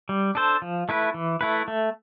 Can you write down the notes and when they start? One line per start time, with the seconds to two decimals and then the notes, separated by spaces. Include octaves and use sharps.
0.09 G3
0.35 D4 A4 C5
0.62 F3
0.89 A3 E4 B4
1.14 E3
1.41 A3 E4 B4
1.68 A3